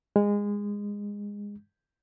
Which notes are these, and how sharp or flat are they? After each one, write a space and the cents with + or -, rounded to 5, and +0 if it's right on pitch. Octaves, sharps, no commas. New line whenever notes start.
G#3 -20